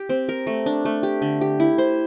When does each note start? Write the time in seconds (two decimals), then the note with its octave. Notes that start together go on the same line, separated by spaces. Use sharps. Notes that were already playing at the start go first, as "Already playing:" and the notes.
Already playing: G4
0.09 C4
0.29 A#4
0.47 A3
0.66 D4
0.85 A3
1.03 G4
1.22 D3
1.41 G4
1.60 E4
1.78 C5